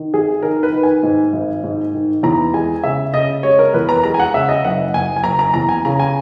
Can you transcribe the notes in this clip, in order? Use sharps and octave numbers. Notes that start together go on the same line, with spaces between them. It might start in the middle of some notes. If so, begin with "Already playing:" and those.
Already playing: D#3
G#1 G#4
D#3 A#4
B4
D#3
G#5
G#2
G#1
G#2
D#3
E2 A#5
G#3 G#5
C#3 E5
C#3 D#5
G#3 C#5
A#4
E2 B4
A#5
G#3 A#5
G#5
F#5
C#3 E5
D#5
F#1 F#5
F#1 G#5
G#5
F#1 A#5
A#5
E2 A#5
G#5
C#3 A#5
G#5